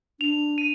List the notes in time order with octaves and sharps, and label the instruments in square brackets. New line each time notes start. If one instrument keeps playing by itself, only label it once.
[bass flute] D4 [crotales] F7
[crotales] D#7